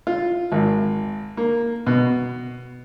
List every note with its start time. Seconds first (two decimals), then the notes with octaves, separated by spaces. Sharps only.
0.07 F4
0.52 G#1
1.37 A#3
1.87 B2